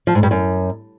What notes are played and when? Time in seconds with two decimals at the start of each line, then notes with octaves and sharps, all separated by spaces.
0.07 F3
0.15 G#2
0.23 G2
0.31 F#2